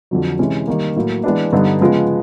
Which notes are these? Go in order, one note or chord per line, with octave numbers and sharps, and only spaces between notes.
F2 D3 F#3
C3 E3 G#3 C#4
D#3 G3 A#3
A2 F#3 A#3
E3 G#3 B3 D4
G2 D3 G3 B3 D#4
C#3 F3 G#3 B3